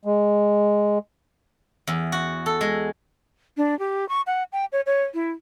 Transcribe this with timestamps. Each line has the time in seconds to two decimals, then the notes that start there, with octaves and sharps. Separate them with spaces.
0.05 G#3
1.87 E2
2.12 F#4
2.46 A4
2.61 G#3
3.57 D4
3.79 G4
4.09 C#6
4.27 F#5
4.52 G5
4.72 C#5
4.86 C#5
5.14 E4